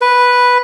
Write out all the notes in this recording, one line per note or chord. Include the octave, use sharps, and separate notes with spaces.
B4